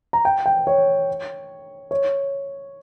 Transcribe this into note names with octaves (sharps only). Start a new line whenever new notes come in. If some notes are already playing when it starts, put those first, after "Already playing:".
A#5
G5
G5
C#5
C#5